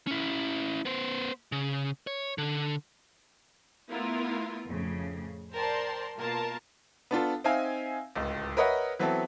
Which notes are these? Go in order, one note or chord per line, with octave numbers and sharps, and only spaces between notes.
C#4 E4
B3 C5
C#3
C#5
D3
A3 B3 E4 F4 A#4
F2 A2 C#3
A#4 C5 D5 G5 A5 C6
B2 A#3 F4 A#4 A5
B3 D4 F4 A4
C4 D#4 E5 F5 G#5
D1 C#2
A#4 B4 C#5 D#5 E5 F#5
E3 F#3 B3 C4 E4 A4